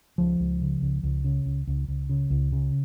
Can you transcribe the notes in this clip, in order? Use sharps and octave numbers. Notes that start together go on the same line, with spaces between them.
C#2 F3
C#2
C#3
C#2
C#2
C#3
C#2
C#2
C#2
C#3
C#2
C#3